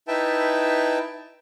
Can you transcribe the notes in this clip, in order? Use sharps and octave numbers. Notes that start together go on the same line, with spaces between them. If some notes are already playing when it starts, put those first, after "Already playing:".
D#4 E4 B4 E5 G5 A5